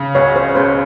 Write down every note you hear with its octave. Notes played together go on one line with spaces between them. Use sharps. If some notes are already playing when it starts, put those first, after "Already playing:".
Already playing: C#3
C#2 C#5
C5
C#5
C#2 C5